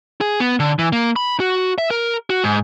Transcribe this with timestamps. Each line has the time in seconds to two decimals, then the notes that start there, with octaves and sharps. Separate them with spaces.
0.21 G#4
0.40 B3
0.60 D3
0.79 E3
0.93 A#3
1.16 B5
1.40 F#4
1.78 E5
1.91 A#4
2.30 F#4
2.44 G#2